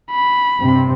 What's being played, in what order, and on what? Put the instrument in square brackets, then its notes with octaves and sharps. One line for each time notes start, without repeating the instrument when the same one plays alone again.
[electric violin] B5
[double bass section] G2 C3 C4